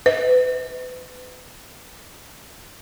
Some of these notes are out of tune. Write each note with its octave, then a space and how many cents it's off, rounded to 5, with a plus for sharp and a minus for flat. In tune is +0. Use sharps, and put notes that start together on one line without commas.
B4 +35 D#5 +45